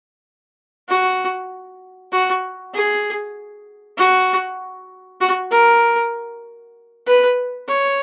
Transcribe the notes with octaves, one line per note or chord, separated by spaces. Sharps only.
F#4
F#4
G#4
F#4
F#4
A#4
B4
C#5